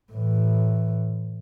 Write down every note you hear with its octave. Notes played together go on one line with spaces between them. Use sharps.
A2 E3